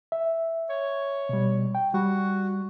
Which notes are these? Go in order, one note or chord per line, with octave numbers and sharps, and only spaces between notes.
E5
C#5
B2 G3
G5
G3 F#4